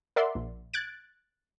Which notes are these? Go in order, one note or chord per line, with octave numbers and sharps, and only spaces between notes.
A#4 D5 E5 F#5 C6
A#1
F#6 G#6 A6 D7